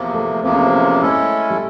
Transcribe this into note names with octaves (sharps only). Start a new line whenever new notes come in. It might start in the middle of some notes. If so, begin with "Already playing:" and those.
Already playing: E2 C3 F3 A#3
A3
E2 C3 F3 A#3 C4
C#4
C4
C#4
G#3 A3 C#4 E4 A4
G3